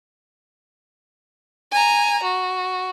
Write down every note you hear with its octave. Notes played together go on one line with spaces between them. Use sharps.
G#5 A#5
F#4